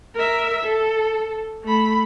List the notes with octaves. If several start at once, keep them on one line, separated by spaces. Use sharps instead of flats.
A#4 E5
A4
A3 B5